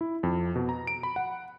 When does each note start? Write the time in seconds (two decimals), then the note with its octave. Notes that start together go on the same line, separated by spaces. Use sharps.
0.01 E4
0.23 F2
0.56 B2
0.69 A#5
0.87 D7
1.03 B5
1.16 F#5